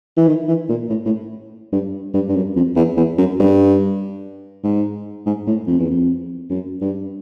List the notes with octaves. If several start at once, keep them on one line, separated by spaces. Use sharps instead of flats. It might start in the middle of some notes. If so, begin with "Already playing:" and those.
E3
D#3
E3
A#2
A2
A2
G2
G2
G2
F#2
F2
E2
E2
F#2
G2
G#2
G#2
A2
F2
E2
F2
F#2
G2